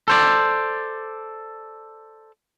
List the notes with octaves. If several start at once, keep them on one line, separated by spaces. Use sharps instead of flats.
A4 C5 D5